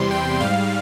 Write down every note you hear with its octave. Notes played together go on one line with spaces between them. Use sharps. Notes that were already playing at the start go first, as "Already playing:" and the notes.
Already playing: E2 C3 G3 C6
G5
G#2 G3 F5